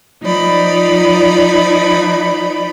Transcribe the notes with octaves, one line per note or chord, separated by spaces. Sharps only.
F3 D#4 D5 B5